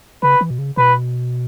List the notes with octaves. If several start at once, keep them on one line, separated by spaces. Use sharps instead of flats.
C#3 B4
E3
B2
C#3
B2 B4